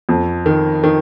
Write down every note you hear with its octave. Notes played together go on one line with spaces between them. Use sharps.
F2
D#3
D#3